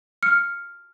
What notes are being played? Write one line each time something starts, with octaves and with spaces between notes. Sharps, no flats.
F6 C#7